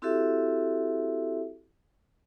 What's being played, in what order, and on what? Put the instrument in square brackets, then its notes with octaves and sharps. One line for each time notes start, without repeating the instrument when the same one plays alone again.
[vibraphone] C4 E4 F#4 G4 A4 E5